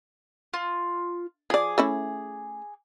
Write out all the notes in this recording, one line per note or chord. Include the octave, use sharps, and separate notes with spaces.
F4
F3 G#4 D5 D6
A3 C#4 E4